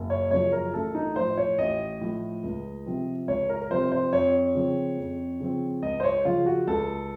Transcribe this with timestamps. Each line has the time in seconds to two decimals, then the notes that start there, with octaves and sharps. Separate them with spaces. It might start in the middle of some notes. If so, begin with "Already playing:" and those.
Already playing: F#1
0.10 C#5
0.31 F#2 C#3 F3 C#5
0.52 A#4
0.73 A1 A4
0.95 D#4
1.16 A2 F3 C5
1.37 C#5
1.58 A1 D#5
2.01 A2 F3
2.44 C#2
2.86 C3 F3 C4
3.28 C#2 C#5
3.49 A#4
3.61 A#4
3.71 C3 F3 C4 C5
3.92 C5
4.13 F2 C#5
4.55 C#3 F3 C4
4.98 F2
5.40 C#3 F3 C4
5.82 C#2 D#5
6.00 C5
6.04 C#5
6.25 C#3 F3 F4
6.46 F#4
6.67 C#2 A4